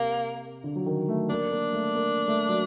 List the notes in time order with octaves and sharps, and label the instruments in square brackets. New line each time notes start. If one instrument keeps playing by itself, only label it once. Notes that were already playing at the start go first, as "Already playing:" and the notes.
Already playing: [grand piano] C3 [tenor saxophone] A#3
[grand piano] D3
F#3
D#3
A3
[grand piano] A#3 [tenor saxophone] D4
[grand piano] A#3
A3
A#3
A3
F#3